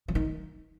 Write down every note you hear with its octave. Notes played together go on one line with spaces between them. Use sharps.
F3
D#3